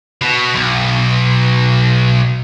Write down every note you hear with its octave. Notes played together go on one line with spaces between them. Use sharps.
B2
B1